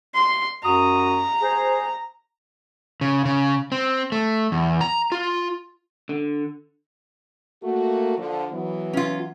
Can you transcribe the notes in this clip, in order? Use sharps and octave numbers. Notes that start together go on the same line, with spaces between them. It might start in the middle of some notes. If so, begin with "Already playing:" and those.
C6
F#2 F#4 A#5 D#6
G#4 C5
C#3
C#3
C4
A3
E2
A#5
F4
D3
A3 A#3 F#4
D3 F3
E3 F#3 B3
C#4 F4